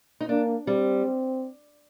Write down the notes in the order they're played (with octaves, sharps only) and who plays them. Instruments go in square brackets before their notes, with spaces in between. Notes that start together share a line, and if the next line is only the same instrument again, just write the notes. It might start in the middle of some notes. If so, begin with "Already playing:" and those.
[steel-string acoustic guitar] D#4
[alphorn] A#3 [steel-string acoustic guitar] D4
[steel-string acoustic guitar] G3 [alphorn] C4